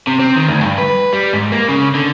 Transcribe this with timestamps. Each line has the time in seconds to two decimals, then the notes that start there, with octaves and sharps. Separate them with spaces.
0.07 C3
0.20 C4
0.36 D#3
0.48 D2
0.62 G2
0.78 B4
1.13 G3
1.33 G#2
1.52 A#3
1.69 C#3
1.95 D3